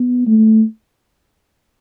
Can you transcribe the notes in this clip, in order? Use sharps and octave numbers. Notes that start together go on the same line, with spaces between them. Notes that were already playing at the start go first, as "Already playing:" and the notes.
Already playing: B3
A3